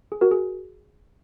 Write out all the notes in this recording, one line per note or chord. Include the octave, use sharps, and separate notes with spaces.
G#4
F#4 A#4
G#4